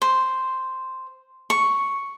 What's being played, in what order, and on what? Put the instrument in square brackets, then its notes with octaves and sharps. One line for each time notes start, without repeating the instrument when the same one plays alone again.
[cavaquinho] C5
C#6